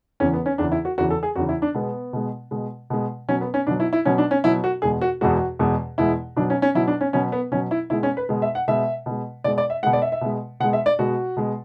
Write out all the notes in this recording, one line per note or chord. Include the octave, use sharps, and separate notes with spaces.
E2 C#3 E3 C#4
B3
C#4
E2 C#3 E3 D4
E4
F#4
E2 C#3 E3 F#4
A4
G#4
E2 C#3 E3 F#4
E4
D4
B2 G#3 B3
B2 G#3
B2 G#3
B2 G#3
B2 F#3 C#4
B3
C#4
B2 F#3 D4
E4
E4
B2 F#3 C#4
D4
C#4
B2 F#3 E4
F#4
E2 B2 G#3 G#4
F#4
E2 B2 G#3 F#4
E2 B2 G#3
E2 B2 G#3 E4
B2 F#3 D4
C#4
C#4
B2 F#3 E4
D4
C#4
B2 F#3 C#4
B3
B2 F#3 C#4
E4
B2 G#3 E4
C#4
B4
B2 G#3
E5
F#5
B2 G#3 E5
B2 G#3
B2 G#3 D5
D5
E5
B2 G#3 F#5
D5
E5
E5
B2 G#3
B2 G#3 F#5
E5
D5
B2 G#3 F#4
B2 G#3